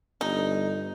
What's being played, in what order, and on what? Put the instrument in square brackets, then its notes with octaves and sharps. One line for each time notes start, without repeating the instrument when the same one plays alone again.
[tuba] G1 [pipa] D#4